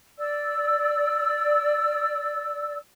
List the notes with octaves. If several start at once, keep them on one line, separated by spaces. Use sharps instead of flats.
D5 E6